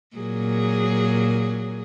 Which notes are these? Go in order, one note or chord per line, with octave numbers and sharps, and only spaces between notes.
A#2 F#3 G#4